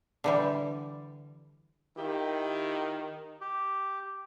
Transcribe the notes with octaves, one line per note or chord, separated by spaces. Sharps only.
D3 E3 G3
D#3 E4 F4 G4
G4